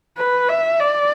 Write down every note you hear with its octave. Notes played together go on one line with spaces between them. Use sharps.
B4
E5
D5